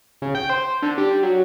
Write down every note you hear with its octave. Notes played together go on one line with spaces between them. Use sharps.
C#3
G5
C5
D3
G3
F#3